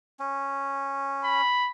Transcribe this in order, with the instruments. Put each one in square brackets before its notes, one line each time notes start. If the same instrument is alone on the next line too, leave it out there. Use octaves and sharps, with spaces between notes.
[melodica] C#4
[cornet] B5